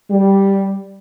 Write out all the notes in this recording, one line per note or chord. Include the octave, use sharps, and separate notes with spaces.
G3